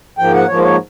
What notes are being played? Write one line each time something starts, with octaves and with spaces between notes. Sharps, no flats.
G#2 F3 A#3 G5
F#5
G#2 F3 A#3 C#5
C5
C#5